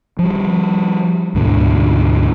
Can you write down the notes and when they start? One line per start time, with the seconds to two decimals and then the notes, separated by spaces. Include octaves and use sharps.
0.19 F3 G3
1.35 D2 G#2 B2 D3